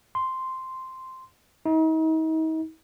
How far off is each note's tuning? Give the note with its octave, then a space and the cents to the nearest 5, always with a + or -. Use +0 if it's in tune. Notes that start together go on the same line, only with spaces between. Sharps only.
C6 -5
D#4 +40